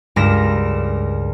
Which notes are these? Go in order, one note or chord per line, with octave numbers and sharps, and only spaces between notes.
C#2 G2 A#4 A#6 B6 E7